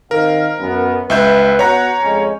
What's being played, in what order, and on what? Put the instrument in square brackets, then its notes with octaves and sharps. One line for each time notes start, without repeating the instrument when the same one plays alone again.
[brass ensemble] D#3 C4 F5 [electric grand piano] A#4
[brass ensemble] F#2 B3
[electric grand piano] C#2 E5 G6 [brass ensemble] B4
[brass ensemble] B3 F#4 F#5 [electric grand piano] C#5 A#5
[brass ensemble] F2 G#3 C#4